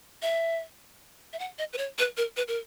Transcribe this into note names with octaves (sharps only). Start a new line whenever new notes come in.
E5
E5
F#5
D#5
B4
C#5
B4
A#4
B4
A#4